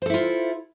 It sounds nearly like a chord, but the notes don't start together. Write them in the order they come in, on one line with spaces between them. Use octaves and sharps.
C5 A4 E4 F4